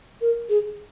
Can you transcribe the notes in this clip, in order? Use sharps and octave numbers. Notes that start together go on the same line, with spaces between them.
A#4
G#4